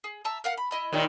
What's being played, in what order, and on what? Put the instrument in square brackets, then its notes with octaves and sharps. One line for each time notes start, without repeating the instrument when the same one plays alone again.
[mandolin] G#4
E5 A5 A#5
A#4 F5 F#5
B5
E4 D#5 B5
[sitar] D#2 A#2 D#3